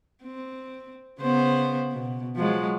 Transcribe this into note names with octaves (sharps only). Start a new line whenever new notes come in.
C4
C#3 B3 C5
B2
F3 F#3 G#3